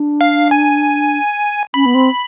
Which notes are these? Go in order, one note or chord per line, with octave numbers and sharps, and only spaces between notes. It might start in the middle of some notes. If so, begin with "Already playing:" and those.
Already playing: D4
F5
G#5
C#4 B5
B3
C4